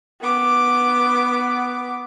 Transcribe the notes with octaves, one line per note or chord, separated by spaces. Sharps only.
B3 D6